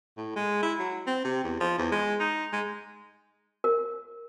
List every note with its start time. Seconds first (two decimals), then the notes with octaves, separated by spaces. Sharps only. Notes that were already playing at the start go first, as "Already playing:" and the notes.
0.17 A2
0.36 G#3
0.63 E4
0.79 F#3
1.07 C4
1.24 C3
1.44 E2
1.60 F3
1.78 E2
1.92 G#3
2.20 D#4
2.53 G#3
3.64 A#4